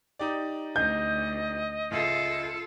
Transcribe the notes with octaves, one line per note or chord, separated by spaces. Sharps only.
D#4 G4 D5
D2 D#5 G6
C#2 F4 A4 E5 C7